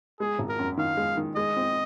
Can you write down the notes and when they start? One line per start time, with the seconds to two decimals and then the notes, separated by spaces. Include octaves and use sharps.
0.20 G#3 G#4
0.39 G#1
0.49 A#4
0.59 F#2
0.77 D#3 F5
0.97 G#3
1.17 D#3
1.36 G#3 D#5
1.56 C4